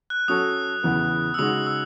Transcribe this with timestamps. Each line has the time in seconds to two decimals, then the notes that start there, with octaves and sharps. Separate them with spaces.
0.10 F#6
0.28 F#3 C#4 F#4 A4 D#6
0.83 E2 C#3 E3 B3
1.34 E6
1.38 C#3 G#3 D#4 F#4 D#6
1.67 E6